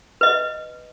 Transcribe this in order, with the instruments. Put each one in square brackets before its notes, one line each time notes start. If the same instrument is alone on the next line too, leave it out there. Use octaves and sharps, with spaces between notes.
[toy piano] B4 D#5